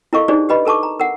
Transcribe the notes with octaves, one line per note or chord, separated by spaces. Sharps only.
E4 A4 A#4 D#5 F5 C#6
D4 D#4 G4 G#4 C5 D5
G4 B4 D#5 B5
A4 A#4 A5 C#6 D6
A#5
A#4 F#5